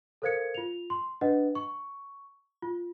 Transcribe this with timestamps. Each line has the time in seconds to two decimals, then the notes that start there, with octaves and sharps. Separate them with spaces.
0.22 A4 A#4 C5 F5 G#6 C#7
0.55 F4 F7
0.90 C6
1.21 D4 B4 D#5 F#5
1.55 C#6
2.62 F4